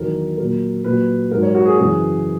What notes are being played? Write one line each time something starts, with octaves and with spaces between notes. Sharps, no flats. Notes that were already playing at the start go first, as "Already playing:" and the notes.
Already playing: E2 D#3 F#3 A#4
A#2 F#3 A#4
A#2 F#3 B4
G#2 F#3 A#4
C#5
F#4
G#4
F#2 C#3 E3 G#4